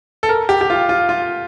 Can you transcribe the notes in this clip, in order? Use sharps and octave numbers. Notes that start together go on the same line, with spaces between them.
A4
A#4
G4
G4
F4
F4
F4